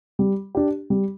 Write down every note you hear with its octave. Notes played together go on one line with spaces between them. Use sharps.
G3
D4 G4
G3